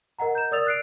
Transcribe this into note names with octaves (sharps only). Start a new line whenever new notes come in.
A#4 D#5 F#5 A#5
G6 E7
A#4 D5 D#6 E6 A6 F7
F#6 C7 D7